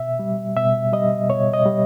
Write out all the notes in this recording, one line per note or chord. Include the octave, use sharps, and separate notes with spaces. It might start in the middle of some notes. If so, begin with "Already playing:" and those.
Already playing: B2 E5
G3
B2 E5
G3 D#5
B2 C#5
D#5
G3